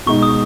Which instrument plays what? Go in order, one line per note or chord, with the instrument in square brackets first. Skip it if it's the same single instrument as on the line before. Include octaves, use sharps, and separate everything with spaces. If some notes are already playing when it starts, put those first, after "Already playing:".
[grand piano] B2 G#3 D#4 [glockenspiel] C#6
[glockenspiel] D#6